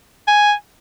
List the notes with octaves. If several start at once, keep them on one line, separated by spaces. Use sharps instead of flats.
G#5